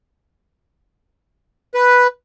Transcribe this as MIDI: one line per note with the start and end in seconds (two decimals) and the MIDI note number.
1.74 2.07 71